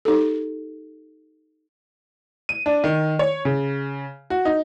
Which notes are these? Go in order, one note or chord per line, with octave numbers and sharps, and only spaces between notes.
D#4 G4 A4
D#7
D4
D#3
C#5
C#3
F#4
D#4